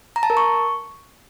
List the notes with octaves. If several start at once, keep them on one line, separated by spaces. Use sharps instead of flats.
A#5
A5
A#4
C#6